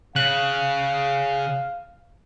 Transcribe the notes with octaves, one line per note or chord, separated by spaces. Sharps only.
C#3 F5 F#6